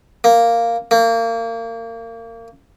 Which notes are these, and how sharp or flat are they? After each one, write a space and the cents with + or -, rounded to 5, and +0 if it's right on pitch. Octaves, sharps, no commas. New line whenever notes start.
A#3 -5
A#3 -30